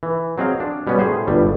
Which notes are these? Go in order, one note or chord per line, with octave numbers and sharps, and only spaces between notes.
E3
F#3 C4 G#4 D#5 F5
D4
B2 G3 B3 C#4
A2 G#4 C5
G1 A2 G3